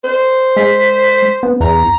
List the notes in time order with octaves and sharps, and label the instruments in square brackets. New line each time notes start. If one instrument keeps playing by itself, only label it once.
[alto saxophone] C5
[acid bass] G#3 [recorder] B6
[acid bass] B3
[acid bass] E2 [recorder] A#5